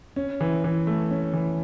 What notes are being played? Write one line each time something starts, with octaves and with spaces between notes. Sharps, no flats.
C#4
E3
E3
A3
C#4
E3